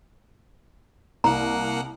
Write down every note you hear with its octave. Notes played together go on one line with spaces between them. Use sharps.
C2 A#3 F#5 A#5